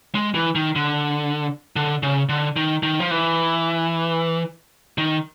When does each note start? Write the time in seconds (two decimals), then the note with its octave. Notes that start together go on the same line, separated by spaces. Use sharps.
0.15 G#3
0.35 E3
0.55 D#3
0.76 D3
1.76 D3
2.03 C#3
2.29 D3
2.56 D#3
2.83 D#3
3.00 F3
3.11 E3
4.98 D#3